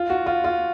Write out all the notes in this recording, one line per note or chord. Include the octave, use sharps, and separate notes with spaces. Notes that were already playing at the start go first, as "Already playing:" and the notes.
Already playing: F4
F#4
F4
F4